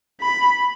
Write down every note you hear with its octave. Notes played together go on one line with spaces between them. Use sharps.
B5